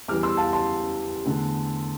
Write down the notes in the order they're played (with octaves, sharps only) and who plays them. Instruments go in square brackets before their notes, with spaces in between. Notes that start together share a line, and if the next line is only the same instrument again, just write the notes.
[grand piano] E2 E3 G3 D6 F6
C6 E6
F5 A5
A5 C6
E2 D3 A3